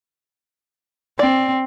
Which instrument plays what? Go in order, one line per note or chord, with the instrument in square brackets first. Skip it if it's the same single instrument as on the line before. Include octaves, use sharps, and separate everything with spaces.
[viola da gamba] C4 [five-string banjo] D5